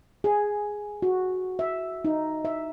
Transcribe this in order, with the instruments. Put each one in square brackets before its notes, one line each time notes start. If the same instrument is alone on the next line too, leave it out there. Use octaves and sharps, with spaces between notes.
[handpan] G#4
F#4
E5
D#4
E5